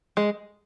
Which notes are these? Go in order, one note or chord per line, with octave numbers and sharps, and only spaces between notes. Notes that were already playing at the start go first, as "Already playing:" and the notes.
G#3